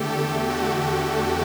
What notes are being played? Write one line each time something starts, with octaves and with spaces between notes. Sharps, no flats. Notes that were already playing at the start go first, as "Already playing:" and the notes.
Already playing: E2 D3 A3 G4 A4
A4
F#4